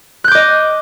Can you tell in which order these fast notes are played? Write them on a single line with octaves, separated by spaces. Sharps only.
F#6 G6 D6 D#5